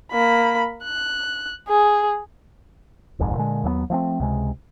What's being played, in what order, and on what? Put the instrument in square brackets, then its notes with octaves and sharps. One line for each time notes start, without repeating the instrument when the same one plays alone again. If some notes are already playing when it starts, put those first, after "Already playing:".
[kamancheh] A#3 B5
F#6
G#4
[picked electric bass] D#1 C2 F2 G#2
A#2 D3 G#3
D#2 F#3 A3 B3
F3 A3 B3 C4
C#2 C3 G#3